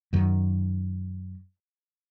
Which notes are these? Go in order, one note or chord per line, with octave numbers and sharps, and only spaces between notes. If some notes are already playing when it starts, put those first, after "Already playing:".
F#2 D#3